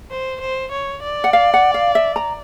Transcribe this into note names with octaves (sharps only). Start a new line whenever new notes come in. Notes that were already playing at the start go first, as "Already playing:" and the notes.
C5
C5
C#5
D5
F#5
F5
F#5
F5
E5
A#5